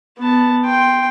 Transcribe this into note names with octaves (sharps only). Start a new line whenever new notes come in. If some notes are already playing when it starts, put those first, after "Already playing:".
B3 A5
G5 C6